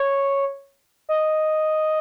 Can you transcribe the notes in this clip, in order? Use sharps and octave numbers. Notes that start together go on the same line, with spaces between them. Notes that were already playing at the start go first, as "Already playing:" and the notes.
Already playing: C#5
D#5